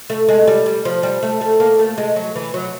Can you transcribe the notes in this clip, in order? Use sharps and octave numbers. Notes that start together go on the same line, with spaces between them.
A3
G#3
G3
G3
F3
G3
A3
A3
A#3
A3
G#3
F#3
E3
F#3